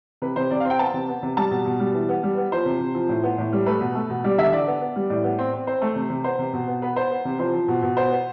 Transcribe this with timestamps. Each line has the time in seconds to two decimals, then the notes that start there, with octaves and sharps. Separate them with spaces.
0.22 C3 B4
0.36 C3 C5
0.51 C3 D5
0.60 F5
0.65 C4
0.70 G5
0.79 B3 A5
0.94 C3
1.09 B3
1.23 C3
1.37 G3 A5
1.51 B2
1.65 B2
1.80 G3
1.94 E3
2.09 B3
2.23 G3
2.37 B3
2.52 F3 C5
2.66 C3
2.80 C3
2.95 F3
3.09 A2
3.24 B3
3.38 A2
3.53 G3
3.66 A3 B4
3.80 B2
3.95 A3
4.10 B2
4.24 G3 D5
4.38 D3 E5
4.52 D3 D5
4.67 B3
4.81 B3
4.96 G3
5.10 A2 D5
5.24 B3
5.39 C4
5.53 C4
5.67 C4 C5
5.82 A3
5.96 C3
6.10 C3
6.24 B3 C5
6.39 C3
6.53 B2
6.68 B3
6.82 B3 B4
6.96 B3 C5
7.11 B3
7.25 C3
7.39 F3 C5
7.53 F3
7.68 B2
7.82 B2
7.97 B3 C5
8.11 B3